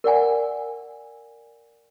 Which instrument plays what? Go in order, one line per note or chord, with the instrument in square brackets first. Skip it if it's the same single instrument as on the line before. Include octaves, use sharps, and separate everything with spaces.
[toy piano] A#4 D5 F#5 G#5